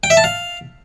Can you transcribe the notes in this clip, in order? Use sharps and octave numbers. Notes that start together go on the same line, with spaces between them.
G5
E5
A5
F5